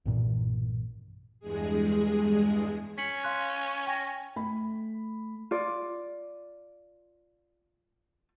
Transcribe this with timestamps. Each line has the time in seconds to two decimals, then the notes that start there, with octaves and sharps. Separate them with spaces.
0.06 B1 G2 A#2 E3
1.40 E2 G2 G#3 G#4
2.98 C#4 B6 C#7 F#7
3.24 F5 C6 F#6
3.87 G5 G#5 A#6
4.36 A3 B5
5.51 F4 D5